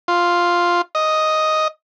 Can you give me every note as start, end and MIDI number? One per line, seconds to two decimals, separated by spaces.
0.08 0.81 65
0.95 1.68 75